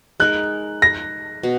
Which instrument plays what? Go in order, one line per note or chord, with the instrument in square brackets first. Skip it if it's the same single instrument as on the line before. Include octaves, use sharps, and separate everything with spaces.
[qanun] G#3 D#4 A#4 [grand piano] F#6
[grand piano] A#6
[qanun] B2